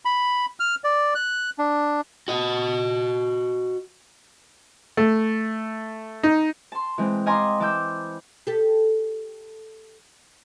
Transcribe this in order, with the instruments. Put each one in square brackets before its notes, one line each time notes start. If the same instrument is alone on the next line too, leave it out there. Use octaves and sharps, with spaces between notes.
[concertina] B5
F6
D5
F#6
D4
[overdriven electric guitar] F#4 D#5
[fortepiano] A3
D#4
[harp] A5 C6
E3 G#3 C4
D#5 F5 G#5 A#5 C6 D6
E3 A5 D6 E6 G6
[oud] G4 A4